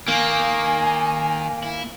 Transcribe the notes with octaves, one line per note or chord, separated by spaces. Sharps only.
D#3 A#3 G#5
E4